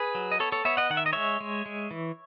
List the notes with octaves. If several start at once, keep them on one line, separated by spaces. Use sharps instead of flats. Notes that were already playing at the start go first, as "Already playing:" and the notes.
Already playing: G#4 B4
F#3
D#5
B3 A4 C#5
A4 C#5
B3 C#5 E5
D#5 F#5
D#3 F#5
E5
D#5
G#3 C#5 E5
G#3
G#3
E3